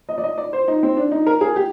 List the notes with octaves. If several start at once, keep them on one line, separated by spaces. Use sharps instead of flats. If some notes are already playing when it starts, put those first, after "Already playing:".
D#5
D5
D#5
D5
C5
D#4
C4
D4
D#4
A#4
G#4
G4